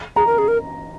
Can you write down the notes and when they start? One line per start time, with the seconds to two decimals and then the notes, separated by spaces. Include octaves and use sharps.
0.16 G#4 A#5
0.27 A#4
0.38 G#4
0.48 A#4